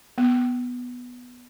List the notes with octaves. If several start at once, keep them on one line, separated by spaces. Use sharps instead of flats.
B3